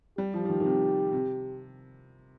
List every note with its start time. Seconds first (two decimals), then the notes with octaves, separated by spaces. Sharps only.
0.18 G3 G4
0.34 F3
0.45 F3
0.50 D#3
0.60 D#3
0.65 C3
1.12 C3